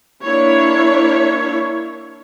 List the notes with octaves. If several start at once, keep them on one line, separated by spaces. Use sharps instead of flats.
A#3 D4 E4 C#5